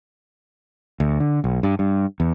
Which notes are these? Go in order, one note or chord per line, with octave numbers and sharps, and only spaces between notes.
D2
D3
B1
G2
G2
E2